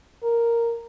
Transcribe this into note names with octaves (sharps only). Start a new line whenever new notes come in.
A#4